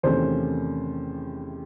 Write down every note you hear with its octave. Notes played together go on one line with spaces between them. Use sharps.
E2 C3 D#3 A3 C#4 C5